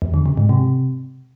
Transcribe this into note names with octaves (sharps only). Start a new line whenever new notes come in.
E2
D3
C#3
G#2
C3